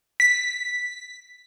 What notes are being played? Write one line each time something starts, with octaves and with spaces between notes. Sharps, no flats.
B6